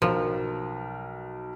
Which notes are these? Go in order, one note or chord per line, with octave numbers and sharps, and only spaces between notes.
B1 F3 A#4